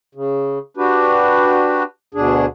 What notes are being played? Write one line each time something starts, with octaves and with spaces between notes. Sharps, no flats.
C#3
D4 F#4 G4 B4
D2 B2 D4 G#4